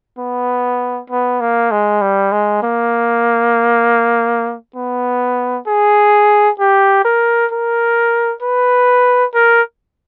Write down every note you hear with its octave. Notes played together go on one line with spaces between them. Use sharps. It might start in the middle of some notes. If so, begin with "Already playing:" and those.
B3
B3
A#3
G#3
G3
G#3
A#3
B3
G#4
G4
A#4
A#4
B4
A#4